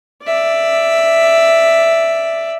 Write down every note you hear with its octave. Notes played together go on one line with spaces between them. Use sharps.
D5 E5